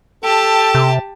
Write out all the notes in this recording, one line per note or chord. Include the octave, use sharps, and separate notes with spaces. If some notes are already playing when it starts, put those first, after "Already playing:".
G4 A4 A5
C3